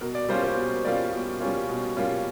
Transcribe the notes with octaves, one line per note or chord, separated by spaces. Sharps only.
B2 A#4
D5
G3 A#3 C#4 F4 C5
C5
B2
G3 A#3 C#4 F4 D5
B2
G3 A#3 C#4 F4
B2
G3 A#3 C#4 F4